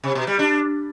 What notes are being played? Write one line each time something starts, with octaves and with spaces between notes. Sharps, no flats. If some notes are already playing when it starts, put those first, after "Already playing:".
C3
B2
G3
D4